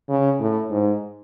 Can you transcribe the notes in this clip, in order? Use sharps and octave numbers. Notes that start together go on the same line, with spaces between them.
C#3
A2
G#2